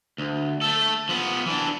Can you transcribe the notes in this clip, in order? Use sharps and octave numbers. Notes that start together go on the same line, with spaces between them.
D2
A3 A4
F3 B3
E3 D4